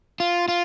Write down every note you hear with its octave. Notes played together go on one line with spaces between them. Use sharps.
F4
F4